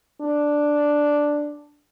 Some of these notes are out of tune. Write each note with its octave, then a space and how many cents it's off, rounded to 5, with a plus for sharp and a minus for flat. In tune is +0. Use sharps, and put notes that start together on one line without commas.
D4 +0